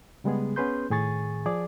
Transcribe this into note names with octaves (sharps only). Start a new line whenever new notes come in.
C#3 G3 G#3 B3 G#4
B3 C#4 G#4 B4 C6 G6
A2 D#3 G#4 G#5 C#6 A6
F3 G#4 D5 D6